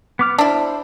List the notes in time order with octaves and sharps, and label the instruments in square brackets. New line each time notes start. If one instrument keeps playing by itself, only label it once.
[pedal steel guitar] B3 D6 F6
[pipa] D4 E4 [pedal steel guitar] C5